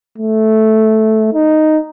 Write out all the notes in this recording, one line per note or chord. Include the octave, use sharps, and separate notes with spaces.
A3
D#4